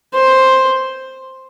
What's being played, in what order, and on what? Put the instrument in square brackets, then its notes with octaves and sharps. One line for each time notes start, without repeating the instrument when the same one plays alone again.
[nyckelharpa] C5